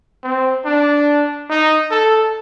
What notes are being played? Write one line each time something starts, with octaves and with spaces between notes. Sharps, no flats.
C4
D4
D#4
A4